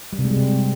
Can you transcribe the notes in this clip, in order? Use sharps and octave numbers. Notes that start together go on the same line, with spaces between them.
G3
C3
G#3
G3
C3